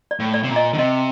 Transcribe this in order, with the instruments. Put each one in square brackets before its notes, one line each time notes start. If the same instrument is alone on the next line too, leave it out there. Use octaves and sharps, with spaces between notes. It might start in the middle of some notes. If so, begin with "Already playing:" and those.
[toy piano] D5
[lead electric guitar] A2
[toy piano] D5
[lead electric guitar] C3
A#2
[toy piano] D#5
[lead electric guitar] D3
[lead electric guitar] C3 [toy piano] D#5